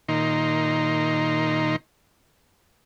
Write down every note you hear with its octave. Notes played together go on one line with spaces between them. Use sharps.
A#2 D#3 D#4 A#5 C6